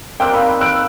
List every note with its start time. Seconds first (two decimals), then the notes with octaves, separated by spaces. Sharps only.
0.20 A#3 C4 D5 G5 E6 F#6
0.34 D#4 B5
0.61 E6 F#6 D7